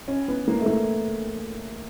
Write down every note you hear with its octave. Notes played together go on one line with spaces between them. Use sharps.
C#4
B3
A#3
A3
A#3